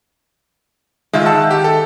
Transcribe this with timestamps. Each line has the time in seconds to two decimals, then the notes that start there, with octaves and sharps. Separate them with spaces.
1.13 G#2 D#3 G#3 F4 E5
1.26 F#5 A5 E6
1.51 G4
1.64 A4